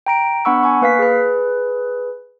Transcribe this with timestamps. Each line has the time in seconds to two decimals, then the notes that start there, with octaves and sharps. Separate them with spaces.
0.06 G5 A#5 D7
0.45 B3 D4 F#5 B5 C#6 E6
0.63 G#5 C#6
0.81 A#3 B4 F5 B6
0.99 G#4 B4